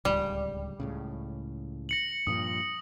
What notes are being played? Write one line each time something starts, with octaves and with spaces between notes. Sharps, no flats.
D1 C#2 G3
C#2 A2 C#3
A#6 C#7 F#7
G2 A#2 F3 D#6